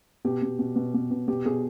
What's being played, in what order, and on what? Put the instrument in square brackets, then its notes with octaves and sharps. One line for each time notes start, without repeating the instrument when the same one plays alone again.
[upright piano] B2 G4
B2
B2
B2
B2
B2
B2 G4
B2 G#4